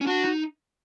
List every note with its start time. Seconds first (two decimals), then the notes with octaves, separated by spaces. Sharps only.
0.01 C#4
0.06 D4 F#4
0.25 D#4